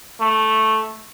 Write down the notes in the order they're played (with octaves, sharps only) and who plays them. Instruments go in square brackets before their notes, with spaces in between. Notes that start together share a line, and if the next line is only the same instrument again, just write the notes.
[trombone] A3